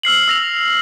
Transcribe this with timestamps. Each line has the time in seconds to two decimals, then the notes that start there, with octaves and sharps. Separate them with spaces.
0.03 E6 F6 C7 F#7
0.28 E6 A#6 F7